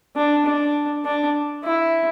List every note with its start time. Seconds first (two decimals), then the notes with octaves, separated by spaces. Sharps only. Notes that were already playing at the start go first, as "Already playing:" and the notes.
0.16 D4
0.45 D4
1.05 D4
1.64 E4